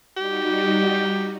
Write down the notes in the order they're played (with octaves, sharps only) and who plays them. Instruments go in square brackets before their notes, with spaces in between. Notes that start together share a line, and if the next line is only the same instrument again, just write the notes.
[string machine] G3 D#4 F#4 [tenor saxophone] G4